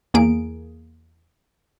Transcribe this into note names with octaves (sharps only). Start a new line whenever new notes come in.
E2 A#3 G#4 D7